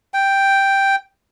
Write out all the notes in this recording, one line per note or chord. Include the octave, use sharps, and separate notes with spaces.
G5